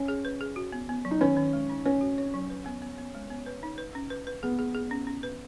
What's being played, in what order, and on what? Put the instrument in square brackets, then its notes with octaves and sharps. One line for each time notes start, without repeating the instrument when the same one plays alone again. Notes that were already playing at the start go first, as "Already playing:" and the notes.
Already playing: [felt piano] C#4
[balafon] G#4
B4
G#4
F#4
B3
B3
F#3
[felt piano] D#4
[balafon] D#3 [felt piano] C#4
[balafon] D#3
G#3
D#4
[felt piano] C#4 [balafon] C#5
[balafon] F#4
C#5
F#3
B4
B3
B3
B3
G#3
B3
B4
D#4
B4
C#4
B4
B4
[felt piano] B3 [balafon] G#4
[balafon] G#4
G#4
C#4
C#4
B4